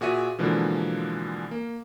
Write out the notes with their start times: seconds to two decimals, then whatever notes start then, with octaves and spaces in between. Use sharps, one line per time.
0.01 A#2 F#4 G#4 E5 D#7
0.38 B2 D3 E3 F3 G#3 A#3
1.51 A#3